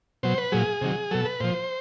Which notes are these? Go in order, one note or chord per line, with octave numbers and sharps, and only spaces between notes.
B2 F#3 C5
B4
A#2 F#3 G#4
C3 D#3 F#3
B2 F#3 A4
B4
A#2 F3 C5